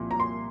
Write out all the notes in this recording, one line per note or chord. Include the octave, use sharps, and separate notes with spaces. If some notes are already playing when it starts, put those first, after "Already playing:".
Already playing: C2 A#2 F3
A#5
C6